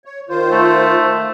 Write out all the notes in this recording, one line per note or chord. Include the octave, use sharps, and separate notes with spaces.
C#5
D#3 F4 C5
A3
D#3